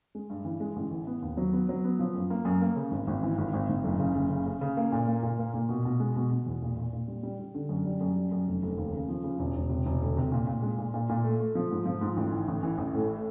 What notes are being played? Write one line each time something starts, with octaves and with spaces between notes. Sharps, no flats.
G#3
G2
E3
G#3
A1
E3
B3
D#2
F#3
B3
F#3
B3
F3
F#2
A#3
F#2
A#3
C#3
G#1
G#1
E3
G#1
G#1
G#1
F#1
C#3
F#1
C#3
C#3
C#3
A#3
A#2
A#3
A#2
A#3
A#2
B2
B2
G#3
B2
B2
E2
A#2
A#2
A#2
G3
G3
G3
D3
F#2
G3
F#2
G3
F#2
F1
F1
D#2
C#3
F3
C#3
E1
E1
C3
E1
D2
C3
A#2
A#2
G#3
A#2
A#2
A#2
A3
A3
F3
G#2
F3
G#2
A1
E3
A1
E3
A1
A2